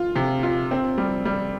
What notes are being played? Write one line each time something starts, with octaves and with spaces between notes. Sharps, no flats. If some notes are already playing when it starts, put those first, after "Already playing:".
Already playing: F4
C3
F4
C4
G3
G3